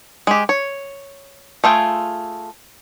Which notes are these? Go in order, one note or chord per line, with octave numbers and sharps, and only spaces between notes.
G#3 G4
C#5
A3 F4 G#4 G5